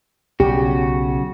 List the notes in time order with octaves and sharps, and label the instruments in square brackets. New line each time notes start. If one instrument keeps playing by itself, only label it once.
[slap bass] B1 [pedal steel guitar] C#3 F#4 [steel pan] G4